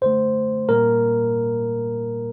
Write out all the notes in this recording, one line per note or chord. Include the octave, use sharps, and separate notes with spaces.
F#2 D3 A3 C5
A#2 G3 A#3 A#4